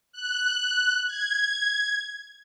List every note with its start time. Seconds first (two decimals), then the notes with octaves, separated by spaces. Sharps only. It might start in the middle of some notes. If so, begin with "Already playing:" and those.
0.13 F#6
1.07 G#6